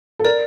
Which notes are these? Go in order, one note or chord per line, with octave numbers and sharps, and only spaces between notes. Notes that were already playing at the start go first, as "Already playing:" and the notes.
A4
A#4 D5